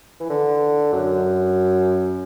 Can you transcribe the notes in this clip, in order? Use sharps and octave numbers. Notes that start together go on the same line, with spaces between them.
E3
D3
F#2